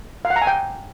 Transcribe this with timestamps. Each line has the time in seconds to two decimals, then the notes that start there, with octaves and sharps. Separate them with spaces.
0.25 F5
0.30 F#5
0.36 A#5
0.42 G#5
0.47 G5